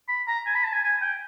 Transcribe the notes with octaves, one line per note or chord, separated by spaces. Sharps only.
B5
A#5
G#5
B5
A5
G#5
G#5
G5